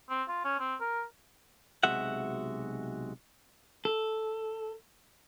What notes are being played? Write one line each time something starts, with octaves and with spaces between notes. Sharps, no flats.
C4
F4
C#4
C4
A#4
B1 C3 G#3 F#4 E5 F#5
A4